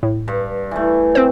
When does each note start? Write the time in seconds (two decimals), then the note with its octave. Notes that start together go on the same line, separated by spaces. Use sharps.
0.03 A2
0.28 G2
0.71 E3 A3
1.15 C4 C5